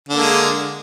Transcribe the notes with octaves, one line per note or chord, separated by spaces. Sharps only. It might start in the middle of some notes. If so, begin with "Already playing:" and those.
D3 G#3 A#3